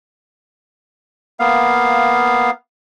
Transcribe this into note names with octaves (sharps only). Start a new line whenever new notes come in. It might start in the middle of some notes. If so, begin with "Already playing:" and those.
A#3 B3 F5